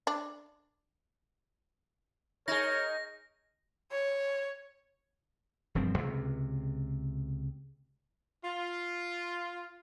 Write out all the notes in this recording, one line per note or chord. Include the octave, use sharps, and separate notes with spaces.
D4
D#4 G#4 A#4 C#5 A#6
C#5
E1 G2 F3 C4
C#2 C3
F4